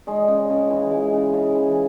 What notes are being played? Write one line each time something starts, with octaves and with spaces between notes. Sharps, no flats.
G#3 D#5
C#3
C#3
E3
G#3
C#3
C#3
E3